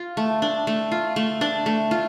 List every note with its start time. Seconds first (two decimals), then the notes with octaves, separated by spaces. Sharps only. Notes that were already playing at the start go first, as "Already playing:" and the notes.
Already playing: F4
0.17 A3
0.42 D4
0.67 A3
0.92 F4
1.16 A3
1.41 D4
1.66 A3
1.91 F4